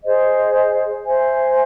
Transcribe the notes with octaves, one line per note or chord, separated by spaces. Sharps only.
G#4 C5 D#5
C5 E5 G#5